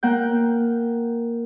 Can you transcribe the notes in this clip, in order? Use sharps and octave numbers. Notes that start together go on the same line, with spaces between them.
A#3 F#5 G5 G6